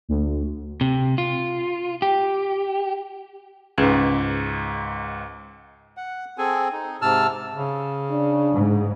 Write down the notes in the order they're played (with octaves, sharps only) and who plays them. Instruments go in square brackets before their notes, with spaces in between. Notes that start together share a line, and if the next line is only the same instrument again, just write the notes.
[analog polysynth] D2
[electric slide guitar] C3
F4
G4
[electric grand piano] C#2 G#2 [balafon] C#4 G#4 B4
[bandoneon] F#5
C4 G#4 A4 G#5
D#4
G#2 C3 A5 E6 F6
[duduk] C#3
[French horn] D4
[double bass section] G#2